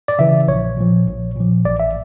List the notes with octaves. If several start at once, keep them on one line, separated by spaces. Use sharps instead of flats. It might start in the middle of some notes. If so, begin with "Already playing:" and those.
D5
C#3 E3 E5
A#1 C#5
A#2 F3
A#1
A#2 F3
A1 D5
E5